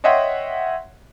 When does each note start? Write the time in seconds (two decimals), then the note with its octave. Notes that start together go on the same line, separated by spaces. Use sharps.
0.04 C#5 D#5 E5 F#5 G5 C6